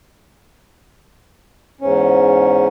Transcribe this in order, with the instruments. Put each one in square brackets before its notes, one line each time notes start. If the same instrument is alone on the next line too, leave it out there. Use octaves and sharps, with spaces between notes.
[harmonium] E2 G#2 C#4